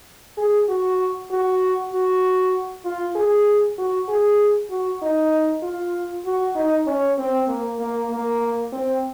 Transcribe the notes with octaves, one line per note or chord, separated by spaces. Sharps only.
G#4
F#4
F#4
F#4
F4
G#4
F#4
G#4
F#4
D#4
F4
F#4
D#4
C#4
C4
A#3
A#3
A#3
C4